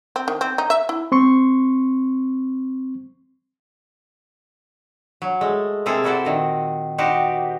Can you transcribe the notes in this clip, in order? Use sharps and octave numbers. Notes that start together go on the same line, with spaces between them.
C4
D#3
C4
D#4
E5
E4
C4 C6 C#6
F#3
G#3 A3
C3 A#3 C4 G#4 A4
A3 E4 F#4 A4 C5 D5
A#2 D#3
D#4 F#4 G4 C5